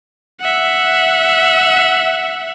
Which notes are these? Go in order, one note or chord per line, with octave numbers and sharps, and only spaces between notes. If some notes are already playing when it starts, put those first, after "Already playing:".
E5 F#5